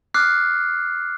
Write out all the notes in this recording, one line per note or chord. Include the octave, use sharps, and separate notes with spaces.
D6 F6 F#6 C7